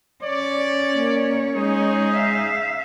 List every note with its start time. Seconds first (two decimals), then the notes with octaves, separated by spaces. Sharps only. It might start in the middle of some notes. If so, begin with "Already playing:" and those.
0.23 C#4 C#5 D5
0.94 A#3
1.54 G#3 D#4 G#4
2.11 E5 F5